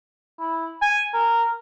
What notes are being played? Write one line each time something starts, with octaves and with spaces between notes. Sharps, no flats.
E4
G#5
A#4